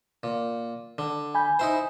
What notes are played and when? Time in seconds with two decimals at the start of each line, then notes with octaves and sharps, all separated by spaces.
0.23 A#2
0.98 D3
1.35 G#5 B5 G6
1.59 D#4 E4 C5